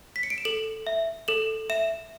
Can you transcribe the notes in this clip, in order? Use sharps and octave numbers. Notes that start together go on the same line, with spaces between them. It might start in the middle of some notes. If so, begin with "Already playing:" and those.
B6
C#7
D7
E7
A4 F#7
E5
A4 F#7
E5 E7